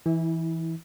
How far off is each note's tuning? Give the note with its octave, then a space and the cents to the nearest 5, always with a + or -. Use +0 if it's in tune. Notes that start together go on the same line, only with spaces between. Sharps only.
E3 +0 E4 -30